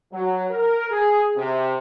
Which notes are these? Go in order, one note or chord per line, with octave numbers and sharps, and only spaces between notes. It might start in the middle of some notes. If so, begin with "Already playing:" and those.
F#3
A#4
G#4
C3